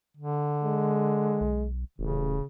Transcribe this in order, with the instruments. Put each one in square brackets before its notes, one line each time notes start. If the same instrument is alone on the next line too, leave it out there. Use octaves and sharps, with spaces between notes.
[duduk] D3
[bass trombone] G#3
[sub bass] B1
[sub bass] D#1 [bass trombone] A1 [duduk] C#3